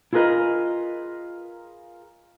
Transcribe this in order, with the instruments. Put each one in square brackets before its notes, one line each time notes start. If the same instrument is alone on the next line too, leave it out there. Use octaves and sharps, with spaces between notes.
[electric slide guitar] E4 F4 G#4 A#4 B4 D#5